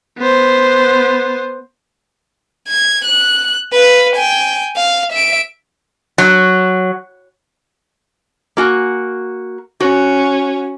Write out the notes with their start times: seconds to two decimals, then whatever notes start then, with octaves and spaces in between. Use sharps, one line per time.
0.18 B3 C5
2.68 G#6
3.05 F#6
3.73 B4 F5
4.16 G5 G#5
4.77 F5
5.12 E5 D7
6.18 F#3
8.57 A#3 F#4 G#5
9.80 C#4 F#4